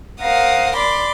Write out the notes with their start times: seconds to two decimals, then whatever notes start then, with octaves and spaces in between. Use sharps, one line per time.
0.22 A#4 C5 F5 F#5 D#6
0.77 D5 B5 C6 D6